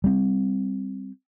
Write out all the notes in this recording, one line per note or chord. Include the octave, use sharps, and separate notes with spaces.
G3 C4